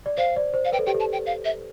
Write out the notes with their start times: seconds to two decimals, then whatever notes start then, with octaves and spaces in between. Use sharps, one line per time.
0.06 D5
0.17 C5 F5
0.36 D5
0.54 C5
0.65 F5
0.72 B4 G5
0.79 A4
0.86 G4 G5
0.94 A4
1.00 A5
1.12 G5
1.26 F5
1.45 E5